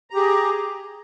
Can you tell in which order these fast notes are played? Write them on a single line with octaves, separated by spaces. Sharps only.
A#5 G4 G#4